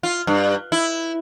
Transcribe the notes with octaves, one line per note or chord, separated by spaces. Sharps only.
F4
G2
E4